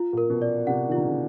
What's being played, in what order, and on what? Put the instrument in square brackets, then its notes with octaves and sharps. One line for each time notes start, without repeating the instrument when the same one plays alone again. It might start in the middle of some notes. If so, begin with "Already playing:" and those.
Already playing: [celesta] F4
[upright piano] A#2 [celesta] A#4
[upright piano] B2
[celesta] D5
[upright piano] C3 [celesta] F#5
[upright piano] D#3 [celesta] F4
[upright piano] D3
C#3